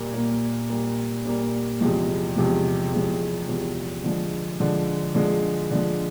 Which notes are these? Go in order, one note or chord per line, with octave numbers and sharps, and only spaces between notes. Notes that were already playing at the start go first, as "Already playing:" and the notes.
Already playing: A#2 G3 A#3
A#2 G3 A#3
A#2 G3 A#3
A#2 G3 A#3
E2 C3 F3 G#3
E2 C3 F3 G#3
E2 C3 F3 G#3
E2 C3 F3 G#3
D3 F3 G#3
D3 F3 G#3
D3 F3 G#3
D3 F3 G#3